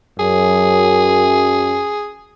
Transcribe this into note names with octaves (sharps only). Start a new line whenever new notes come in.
F#2 G#4